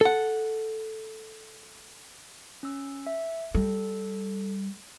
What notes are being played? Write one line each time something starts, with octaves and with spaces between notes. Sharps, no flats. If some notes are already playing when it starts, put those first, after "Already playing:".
A4 F#5
C#4 E6
E5
G3 A4